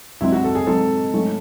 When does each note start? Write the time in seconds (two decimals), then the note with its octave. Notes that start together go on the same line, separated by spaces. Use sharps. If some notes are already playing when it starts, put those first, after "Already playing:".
0.21 G#2 F#3 C4 E4
0.32 F#4
0.44 A4
0.55 G#4
0.67 G#2 F#3 C4 A4
1.13 G#2 F#3 A3 C#4